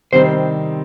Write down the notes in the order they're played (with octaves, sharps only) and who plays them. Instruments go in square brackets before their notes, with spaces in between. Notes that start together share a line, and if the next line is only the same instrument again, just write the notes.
[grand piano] C3 D#3 G3 C4 D#4 [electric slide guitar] C5